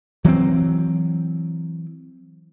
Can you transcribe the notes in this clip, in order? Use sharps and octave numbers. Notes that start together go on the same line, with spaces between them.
E3 F#3 G#3 C4